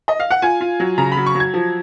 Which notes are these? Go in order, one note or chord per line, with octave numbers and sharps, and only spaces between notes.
D#5
F5
F#5
F4 G#5
F4
F#3
C#3 A#5
B5
F#3
C#6
F#3
G#6
F3